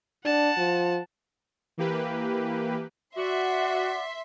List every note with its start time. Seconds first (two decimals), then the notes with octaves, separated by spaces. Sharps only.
0.25 D4 F#5 A5
0.58 F3
1.78 E3 A#3 G4 B4
3.16 F#4 D5 E5 F#5 C6 D6 B6